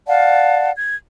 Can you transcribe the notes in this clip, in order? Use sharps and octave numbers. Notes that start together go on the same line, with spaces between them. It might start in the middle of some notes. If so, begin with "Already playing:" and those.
D5 F5 F#5 A5
G#6